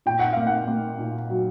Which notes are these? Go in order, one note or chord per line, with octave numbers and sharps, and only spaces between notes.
A#2 G5
F#5
A#3 F5
F#5
A#3
A#2
F#3